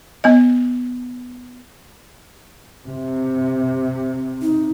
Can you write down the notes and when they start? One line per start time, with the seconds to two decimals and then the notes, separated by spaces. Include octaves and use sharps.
0.24 B3 D#5
2.88 C3
4.42 D#4